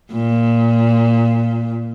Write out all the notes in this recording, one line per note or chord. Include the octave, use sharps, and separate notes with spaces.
A#2